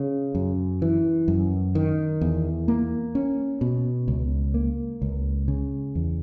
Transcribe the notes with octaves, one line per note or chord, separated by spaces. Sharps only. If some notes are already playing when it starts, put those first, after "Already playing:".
Already playing: C#3
F#2
E3
F#2
D#3
E2
A#3
C#4
B2
C#2
A#3
C#2
C#3
E2